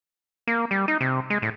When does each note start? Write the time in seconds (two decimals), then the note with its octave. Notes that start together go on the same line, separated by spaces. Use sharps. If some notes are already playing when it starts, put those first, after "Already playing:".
0.47 A#3
0.71 G3
0.88 D#4
1.01 C3
1.30 G#3
1.42 A2